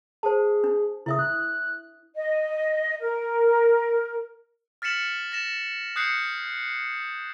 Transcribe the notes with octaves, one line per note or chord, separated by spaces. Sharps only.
G#4 C5 A5
D4
C#3 E4 E5 D#6
F#6
D#5
A#4
F6 A6 B6 C#7 E7 F#7
A6 A#6 E7
D#6 F#6 G6 C7 C#7